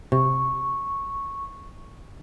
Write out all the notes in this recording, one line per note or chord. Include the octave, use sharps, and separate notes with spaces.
C3 C#6